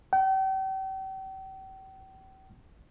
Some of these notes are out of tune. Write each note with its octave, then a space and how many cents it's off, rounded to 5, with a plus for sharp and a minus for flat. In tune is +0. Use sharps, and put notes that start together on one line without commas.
G5 -40